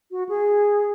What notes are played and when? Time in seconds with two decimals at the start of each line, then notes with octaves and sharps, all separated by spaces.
0.11 F#4
0.29 G#4